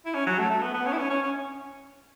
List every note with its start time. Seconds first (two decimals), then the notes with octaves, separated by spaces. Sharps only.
0.06 E4
0.14 C#4
0.27 F#3
0.38 A3
0.51 A3
0.62 B3
0.74 B3
0.86 C#4
0.93 E4
0.98 C#4
1.10 C#4
1.23 C#4